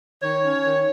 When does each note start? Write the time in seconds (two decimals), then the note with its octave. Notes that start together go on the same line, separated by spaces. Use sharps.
0.22 D#3 C#5
0.43 C#4
0.64 D#3